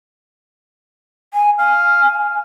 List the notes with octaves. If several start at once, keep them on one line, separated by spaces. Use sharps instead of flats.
G#5
F5 G#5